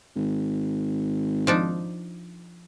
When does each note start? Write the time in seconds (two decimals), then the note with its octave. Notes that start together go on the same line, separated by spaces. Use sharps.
0.16 G#1
1.47 F3 D4 D#4